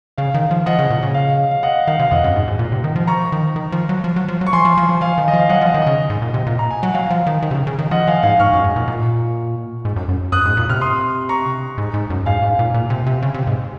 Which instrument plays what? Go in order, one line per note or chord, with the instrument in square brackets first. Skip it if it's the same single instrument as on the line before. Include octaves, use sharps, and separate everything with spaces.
[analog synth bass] C#3 [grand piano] F5
[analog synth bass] D#3
F3
[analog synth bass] F3 [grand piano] D#5 F#5
[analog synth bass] C#3
A#2
C#3
[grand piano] F5
F5
D#5 F#5
[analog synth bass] D#3 [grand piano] F5
[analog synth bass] C3 [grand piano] F5
[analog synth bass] F2 [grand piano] D#5 F#5
[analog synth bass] F#2
G#2
G#2
A#2
C3
D#3
F3
[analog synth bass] F3 [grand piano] A#5 C#6
[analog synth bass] D#3
D#3
F3
F#3
F3
F#3
F3
F#3
[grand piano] C#6
[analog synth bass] F3 [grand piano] G#5 C6
[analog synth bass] F3
F3
F3
[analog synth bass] F3 [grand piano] F5 G#5
[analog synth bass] D#3
[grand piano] D#5
[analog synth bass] F3
[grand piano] F5
[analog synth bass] F#3 [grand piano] D#5 F#5
[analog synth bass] F3
[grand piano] D#5
[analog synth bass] D#3
[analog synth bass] C#3 [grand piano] D#5
[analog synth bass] G#2
A#2
C3
A#2
[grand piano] A#5
G#5
[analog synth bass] F#3 [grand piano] F#5
[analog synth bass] F#3 [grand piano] F5
[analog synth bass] F3
D#3
D#3
C3
C#3
C#3
D#3
[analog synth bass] F3 [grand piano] D#5 F#5
[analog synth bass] F3 [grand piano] F5 G#5
[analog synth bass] G#2 [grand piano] F5 G#5
[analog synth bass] G#2 [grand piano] C#6 F6
[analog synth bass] F#2
G#2
A#2
A#2
G#2
F#2
F#2
[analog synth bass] F#2 [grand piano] D#6 F#6
[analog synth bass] G#2
A#2
[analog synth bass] C3 [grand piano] F6
[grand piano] C6 D#6
A#5 C#6
[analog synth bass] G#2
G#2
F#2
[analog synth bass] G#2 [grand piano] F5 G#5
[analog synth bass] G#2
A#2
A#2
C3
C3
C#3
C3
G#2